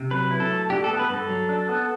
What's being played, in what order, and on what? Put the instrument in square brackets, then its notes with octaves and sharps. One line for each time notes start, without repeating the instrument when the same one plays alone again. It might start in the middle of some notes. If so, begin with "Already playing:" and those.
Already playing: [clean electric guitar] C3
[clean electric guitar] F#3 [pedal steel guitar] B4
[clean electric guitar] E4
[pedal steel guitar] A4
[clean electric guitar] A3
[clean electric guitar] D4 [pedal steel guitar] G4
[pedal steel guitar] A4
[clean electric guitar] B3
[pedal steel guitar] B4
[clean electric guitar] G2 [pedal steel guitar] A4
[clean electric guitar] F#3
D4
B3